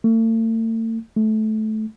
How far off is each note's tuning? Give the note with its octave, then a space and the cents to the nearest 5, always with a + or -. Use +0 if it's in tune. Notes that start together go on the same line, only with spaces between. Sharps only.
A3 +40
A3 -20